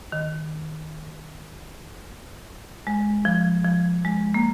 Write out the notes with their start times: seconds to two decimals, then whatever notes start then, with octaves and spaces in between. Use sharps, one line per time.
0.12 D#3
2.87 G#3
3.25 F3
3.65 F3
4.05 G#3
4.34 A#3